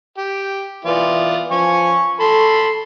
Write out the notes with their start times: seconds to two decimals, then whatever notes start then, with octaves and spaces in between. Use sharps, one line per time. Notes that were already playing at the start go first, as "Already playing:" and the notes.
0.18 G4
0.85 E3 B3 F4 D5
1.51 F3 G#5 C#6
2.20 A4 A5 B5 C6